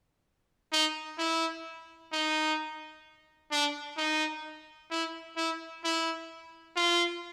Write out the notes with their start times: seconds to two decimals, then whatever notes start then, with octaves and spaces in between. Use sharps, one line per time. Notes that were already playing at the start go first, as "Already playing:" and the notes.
0.72 D#4
1.18 E4
2.12 D#4
3.51 D4
3.97 D#4
4.91 E4
5.37 E4
5.84 E4
6.76 F4